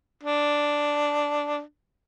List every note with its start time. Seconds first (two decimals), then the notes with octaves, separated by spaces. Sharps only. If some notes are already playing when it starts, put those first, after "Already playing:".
0.23 D4